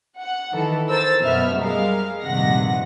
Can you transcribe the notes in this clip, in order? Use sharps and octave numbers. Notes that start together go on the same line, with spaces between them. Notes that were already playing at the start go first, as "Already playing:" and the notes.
F#5
D#3 E3 A4
A#4 C5 E6 A6
F#2 B2 B3 E5 F6
G3 G#3 A#4 F5
A#1 G2 C3 D#3 F#5 A#6